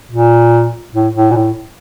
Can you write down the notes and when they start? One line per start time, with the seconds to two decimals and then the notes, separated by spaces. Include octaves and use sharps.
0.12 A#2
0.94 A2
1.15 A2
1.31 A#2
1.36 A2